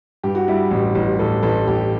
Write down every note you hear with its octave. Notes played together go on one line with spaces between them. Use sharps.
G2 G4
F#4
G3 E4
A1
A1
A1 A4
A1 A4
A1 G4